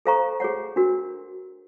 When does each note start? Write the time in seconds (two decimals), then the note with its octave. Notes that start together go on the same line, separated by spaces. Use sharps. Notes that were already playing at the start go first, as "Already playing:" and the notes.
0.06 A4 C5 F5 A#5 C#6
0.40 G#4 C#5 F#5
0.76 D4 F#4 A#4